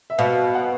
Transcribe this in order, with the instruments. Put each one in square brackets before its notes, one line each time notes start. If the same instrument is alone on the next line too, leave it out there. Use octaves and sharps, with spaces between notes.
[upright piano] E5
[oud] B2 [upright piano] F5
[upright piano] F#5